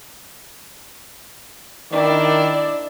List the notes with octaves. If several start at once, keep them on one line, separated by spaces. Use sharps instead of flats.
D#3 D4 E4 D5